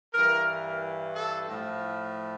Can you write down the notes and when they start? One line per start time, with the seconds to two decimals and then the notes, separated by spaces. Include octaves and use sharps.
0.13 G2 E3 A#4
1.14 A4
1.48 A2 F3